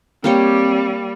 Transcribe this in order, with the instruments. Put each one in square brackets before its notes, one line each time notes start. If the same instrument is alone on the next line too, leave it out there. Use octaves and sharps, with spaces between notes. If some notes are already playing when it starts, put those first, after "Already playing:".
[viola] G3 [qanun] A#3 G4 C#5 [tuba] C4